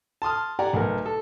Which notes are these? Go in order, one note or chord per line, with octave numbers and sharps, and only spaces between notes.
A5 C6 D#6 F6
G4 D5 F#5 G#5 A#5
B1 A3 A#4
A4